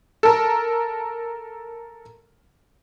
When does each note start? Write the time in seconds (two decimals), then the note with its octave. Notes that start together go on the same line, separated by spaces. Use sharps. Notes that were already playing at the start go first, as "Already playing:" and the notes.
0.23 A4 A#4